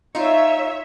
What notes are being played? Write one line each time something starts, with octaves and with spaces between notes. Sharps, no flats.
D#4 F4 C#5 E5